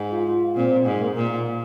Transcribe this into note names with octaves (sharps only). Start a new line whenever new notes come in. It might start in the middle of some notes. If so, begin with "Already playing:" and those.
Already playing: G#2
F4
A#2 C4
G#2
A#3
A#2